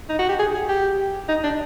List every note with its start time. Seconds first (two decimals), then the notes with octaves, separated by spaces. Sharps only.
0.09 D#4
0.19 F#4
0.29 G4
0.39 G#4
0.54 G#4
0.69 G4
1.29 D#4
1.44 D4